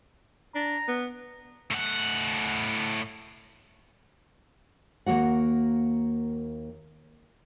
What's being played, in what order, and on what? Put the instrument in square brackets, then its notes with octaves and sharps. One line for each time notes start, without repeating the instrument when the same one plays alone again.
[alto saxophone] D4 [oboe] A#5
[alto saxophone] B3
[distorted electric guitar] A2 F#5
[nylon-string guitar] D#2 F3 A#3 F#4 F#5